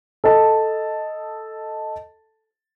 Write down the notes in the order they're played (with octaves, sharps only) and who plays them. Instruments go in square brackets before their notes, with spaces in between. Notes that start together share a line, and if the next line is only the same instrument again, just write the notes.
[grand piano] A4 D#5 A5